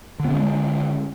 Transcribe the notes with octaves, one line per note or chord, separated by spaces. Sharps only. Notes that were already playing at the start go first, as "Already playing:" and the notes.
D3 G#3 B3 C#4